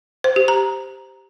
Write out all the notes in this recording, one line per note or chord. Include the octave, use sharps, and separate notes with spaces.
C5
G4
A#5